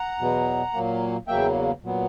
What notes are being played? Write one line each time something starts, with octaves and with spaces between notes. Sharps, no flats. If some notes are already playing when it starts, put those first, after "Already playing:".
Already playing: F#5 A#5
E2 B2 F#3 B3
A#2 F#3 A#3
E2 C#3 F#3 A#3 E5 G5
A#2 F#3 B3